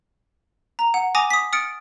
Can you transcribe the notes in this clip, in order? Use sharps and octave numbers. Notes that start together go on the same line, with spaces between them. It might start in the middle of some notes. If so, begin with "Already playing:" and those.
A#5
F#5
G#5 D6 D#6 A#6 F7
D#6 B6
D#6 F6 A6 C#7 D7